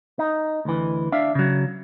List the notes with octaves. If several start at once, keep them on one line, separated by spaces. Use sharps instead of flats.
D#4
D2 E3
D4 E5 F5
C#3 F#3